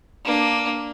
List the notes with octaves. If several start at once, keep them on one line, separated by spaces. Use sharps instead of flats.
A#3 D4